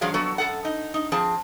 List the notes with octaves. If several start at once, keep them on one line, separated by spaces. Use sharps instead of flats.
G2 F3 F#3 G#4 F5
F2 F#3 B3 F#4 A4
F#2 A4 F#5
D#4
D#4
F3 C4 G#4 A5